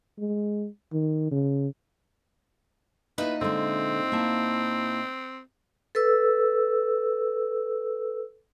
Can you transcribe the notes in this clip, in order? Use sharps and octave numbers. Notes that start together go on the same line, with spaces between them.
G#3
D#3
C#3
A#2 B3 D#4 E4 B4 E5
D3 G#3 C4
A#3 E4 A5
A4 B4 E6